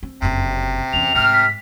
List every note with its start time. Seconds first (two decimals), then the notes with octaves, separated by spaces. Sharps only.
0.03 C4
0.22 F#1 F2 C3
0.93 E2 C#4 F7
1.15 G#2 C3 A3 F6
1.33 B6